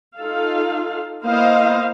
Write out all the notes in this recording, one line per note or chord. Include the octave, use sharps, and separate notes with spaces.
D#4 F4 A4 F5
A#3 B3 E4 C5 D#5 F5